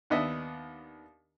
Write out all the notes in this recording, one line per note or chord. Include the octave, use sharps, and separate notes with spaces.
D#2 B3 D4 D#5 E5